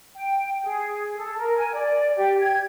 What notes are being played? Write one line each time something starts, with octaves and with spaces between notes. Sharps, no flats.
G5
G#4
A4
A#4
G#5
D5
G4
G#6